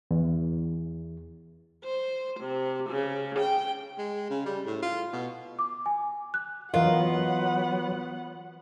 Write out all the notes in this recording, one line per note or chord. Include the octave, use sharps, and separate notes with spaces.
E2
C5
C3
C#3
G5
G#3
C#3
G3
A2
F4
B2
D6
G#5
F#6
E3 F#3 B3 F4 A#4 D#5 F#5